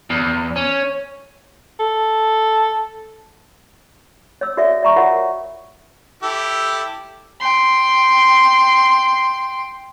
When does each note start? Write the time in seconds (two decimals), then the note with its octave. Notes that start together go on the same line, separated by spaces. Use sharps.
0.10 E2
0.56 C#4
1.80 A4
4.41 C#5 E6
4.57 F#4 A4 D5 E5
4.83 D5 E5 A#5 C#6
4.96 F4 F#4 A#4 C#5 E5 F#5
6.23 E4 G4 A4
7.40 G5 C6